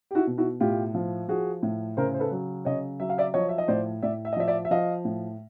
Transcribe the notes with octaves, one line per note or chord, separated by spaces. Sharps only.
G4
E4 F#4
B2
E4 F#4
A2 F4 G4
F3
F3 F#4 G#4
A2
C#3 A#4 C5
C5
A4 B4
F#3
C#3 C#5 D#5
F#3 E5
F5
D5 E5
F3 C#5 D#5
E5
D#5
A2 C5 D5
A2 D5 E5
E5
D#5
F3 D5 E5
D5 E5
E5
F3 D#5 F5
A2